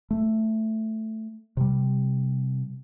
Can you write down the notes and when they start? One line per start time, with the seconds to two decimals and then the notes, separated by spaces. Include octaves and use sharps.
0.11 A3
1.57 C3 G3